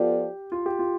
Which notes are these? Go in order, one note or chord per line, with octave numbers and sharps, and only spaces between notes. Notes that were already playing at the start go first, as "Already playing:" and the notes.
Already playing: F3 B3 F4 G4 A4 D5
F4
G4
F4